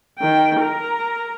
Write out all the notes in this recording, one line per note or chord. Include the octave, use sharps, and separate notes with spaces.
D#3 G5
A#4 A#5